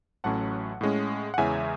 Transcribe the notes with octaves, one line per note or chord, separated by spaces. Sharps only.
A1 A2 F#3 A3 C#4 F#5 A5
A2 G#3 C#4
F#5
E2 C#3 E3 G#3 C#4 E5 G#5